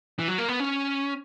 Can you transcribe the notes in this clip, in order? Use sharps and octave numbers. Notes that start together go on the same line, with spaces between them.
E3
F#3
A#3
B3
C#4